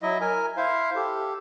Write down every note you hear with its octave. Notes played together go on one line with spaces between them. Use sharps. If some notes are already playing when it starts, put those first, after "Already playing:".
F#3 E4 D#5
A#4 G#5
E4 C5 F5
G4 A4